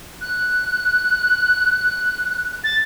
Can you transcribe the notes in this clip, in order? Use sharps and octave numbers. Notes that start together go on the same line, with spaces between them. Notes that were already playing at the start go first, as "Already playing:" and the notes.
F#6
A6